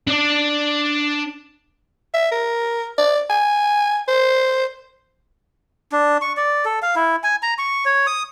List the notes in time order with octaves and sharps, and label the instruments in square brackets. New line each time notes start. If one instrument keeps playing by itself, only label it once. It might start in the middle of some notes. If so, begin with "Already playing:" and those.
[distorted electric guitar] D4 D5
[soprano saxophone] E5
A#4
D5
G#5
C5
[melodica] D4
C#6
D5
A4
F5
E4
G#5
A#5
C#6
C#5
D#6